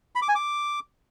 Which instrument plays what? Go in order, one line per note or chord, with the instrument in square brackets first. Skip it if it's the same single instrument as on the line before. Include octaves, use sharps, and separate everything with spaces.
[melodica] B5
D6
G#5
D6